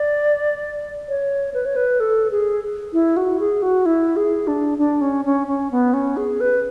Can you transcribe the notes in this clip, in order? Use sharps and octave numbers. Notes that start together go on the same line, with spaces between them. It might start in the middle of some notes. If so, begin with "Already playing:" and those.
Already playing: D5
C#5
B4
C#5
B4
A4
G#4
E4
F#4
G#4
F#4
E4
G#4
D4
D4
C#4
C#4
C#4
B3
C#4
G#4
B4